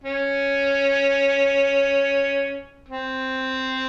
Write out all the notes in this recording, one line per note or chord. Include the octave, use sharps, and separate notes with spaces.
C#4
C4